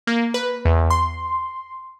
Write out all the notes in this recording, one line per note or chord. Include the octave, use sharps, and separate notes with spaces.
A#3
B4
E2
C6